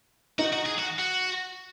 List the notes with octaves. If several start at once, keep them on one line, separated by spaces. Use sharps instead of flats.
D#4 F#4
F#4
G#4
F#4
F#4